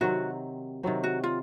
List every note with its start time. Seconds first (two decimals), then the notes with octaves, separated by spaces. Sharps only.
0.01 C3 D#3 F#3 C4 F#4
0.83 C3 D#3 F#3 C4
1.04 F#4
1.24 F4